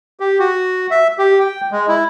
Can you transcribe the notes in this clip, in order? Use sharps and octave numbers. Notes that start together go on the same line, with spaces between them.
G4
F#4
E5
G4
G5
G#3
E4